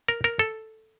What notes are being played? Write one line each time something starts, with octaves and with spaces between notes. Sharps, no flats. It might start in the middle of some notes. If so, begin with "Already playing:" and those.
A#4
A#4
A4